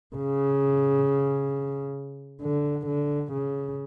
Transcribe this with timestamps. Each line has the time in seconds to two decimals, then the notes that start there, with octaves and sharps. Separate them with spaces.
0.16 C#3
2.42 D3
2.87 D3
3.33 C#3